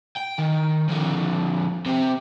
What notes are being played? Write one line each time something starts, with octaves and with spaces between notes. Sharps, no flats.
G5
D#3
F2 D3
C3 C4